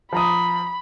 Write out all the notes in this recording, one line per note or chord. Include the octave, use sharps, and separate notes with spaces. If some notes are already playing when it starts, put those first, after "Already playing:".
F3 A#5 B5 D#6